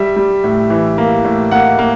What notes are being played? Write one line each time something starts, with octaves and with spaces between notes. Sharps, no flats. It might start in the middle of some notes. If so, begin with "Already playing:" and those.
Already playing: G3 E5
G3
A2
E3
A#3
A2
A#3 F#5
A#3